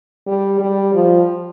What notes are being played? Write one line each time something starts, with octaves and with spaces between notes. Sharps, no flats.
G3
G3
F3